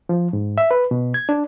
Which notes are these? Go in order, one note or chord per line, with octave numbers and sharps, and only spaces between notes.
F3
G#2
E5
B4
B2
G#6
D4